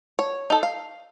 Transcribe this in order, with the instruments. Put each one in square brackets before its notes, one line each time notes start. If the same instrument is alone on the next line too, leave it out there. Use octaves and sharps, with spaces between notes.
[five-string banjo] C#5
D#4 A4
F5